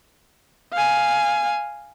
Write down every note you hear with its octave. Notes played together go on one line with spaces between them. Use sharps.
F5 G#5